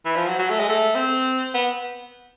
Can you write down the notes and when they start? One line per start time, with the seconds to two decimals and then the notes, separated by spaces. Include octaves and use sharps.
0.05 E3
0.16 F3
0.27 F#3
0.39 F#3
0.50 A3
0.59 G#3
0.69 A3
0.95 C4
1.54 B3